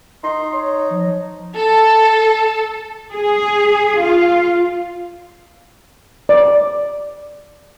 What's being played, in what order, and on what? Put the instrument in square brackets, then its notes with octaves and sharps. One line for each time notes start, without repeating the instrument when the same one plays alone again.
[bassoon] D#4 [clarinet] C6
[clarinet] C#5
F3
[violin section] A4
[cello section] G#4
F4
[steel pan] D5